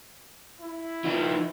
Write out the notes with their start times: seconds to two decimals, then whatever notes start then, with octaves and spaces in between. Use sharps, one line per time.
0.61 E4
1.04 F3 D#4